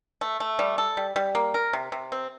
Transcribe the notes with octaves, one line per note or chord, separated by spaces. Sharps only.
A3
A3
G3
A4
G3
G3
A#3
A#4
C3
C3
C4